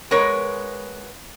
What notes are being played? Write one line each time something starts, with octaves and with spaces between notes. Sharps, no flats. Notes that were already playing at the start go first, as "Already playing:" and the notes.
G#3 B3 A#4 C#5